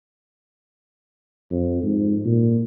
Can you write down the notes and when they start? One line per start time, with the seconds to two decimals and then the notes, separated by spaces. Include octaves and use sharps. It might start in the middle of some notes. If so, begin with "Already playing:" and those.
1.51 F2
1.83 G#2
2.25 A#2